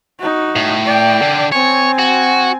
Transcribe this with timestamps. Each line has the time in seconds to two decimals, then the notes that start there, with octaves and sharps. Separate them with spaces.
0.19 D#4 F#4
0.56 A2
0.85 D5 G5
1.22 D3
1.52 C4 C#5 G#5
1.99 F#4